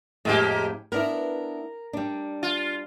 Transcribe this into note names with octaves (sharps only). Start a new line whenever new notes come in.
F2 A2 G#3 A#3 G4
B3 D4 E4 A#4
G3 D4
F4